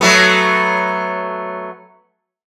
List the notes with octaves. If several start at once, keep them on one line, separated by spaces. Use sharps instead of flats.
F#3 A3 B3